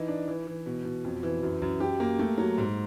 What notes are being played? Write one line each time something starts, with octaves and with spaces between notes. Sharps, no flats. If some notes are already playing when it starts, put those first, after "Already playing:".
Already playing: E3 D#4
D4
E3
E3
B2
B2
F2
E3
F#2
F#2
G4
A#3
A3
F#3
G#2